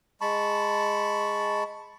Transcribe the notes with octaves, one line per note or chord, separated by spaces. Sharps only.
G#3 A5 B5 C#6